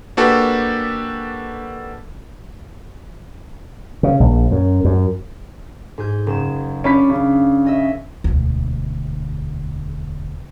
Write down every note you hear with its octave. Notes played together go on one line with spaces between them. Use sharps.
A#3 D4 F#4 G4 A4 B4
C#3
A#1
F#2
F#2
G#2 G#4 G6
F#1 E7
C#4 D4 D5 F5 B5 B6
C#3
C#4 D#5 E5
E1 D2